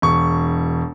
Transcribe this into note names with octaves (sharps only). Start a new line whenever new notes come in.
E1 C#6